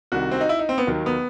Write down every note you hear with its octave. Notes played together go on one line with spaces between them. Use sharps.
C2 C3 D#3 F#4
C4
D#4
E4
D#4
C4
B3
D#2 D#3 F#3
B3